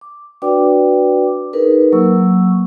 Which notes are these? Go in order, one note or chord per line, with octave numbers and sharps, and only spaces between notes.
D6
D4 F#4 B4 D5 G5 D6
D#4 G#4 A#4 B4
F#3 A#3 C#6 E6